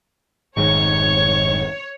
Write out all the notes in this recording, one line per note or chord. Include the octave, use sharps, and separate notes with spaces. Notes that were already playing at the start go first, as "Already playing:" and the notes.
F1 G#2 D#3 C#5 C#6